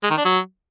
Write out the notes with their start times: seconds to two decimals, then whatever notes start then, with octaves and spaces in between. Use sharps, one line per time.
0.03 G#3
0.10 D#3
0.18 D4
0.25 F#3